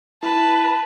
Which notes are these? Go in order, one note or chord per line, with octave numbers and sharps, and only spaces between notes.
E4 B4 A5